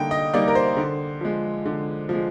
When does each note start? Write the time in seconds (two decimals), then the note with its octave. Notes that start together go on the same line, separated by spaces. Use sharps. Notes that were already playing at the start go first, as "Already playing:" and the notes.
Already playing: D3 G3 A#3 D#4 G5
0.11 D#5
0.33 G3 A#3 D#4 D5
0.48 A#4
0.55 C5
0.77 D3
1.21 F3 G#3
1.65 D3
2.09 F3 G#3